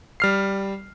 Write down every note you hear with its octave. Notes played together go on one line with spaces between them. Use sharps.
G3 F6 C7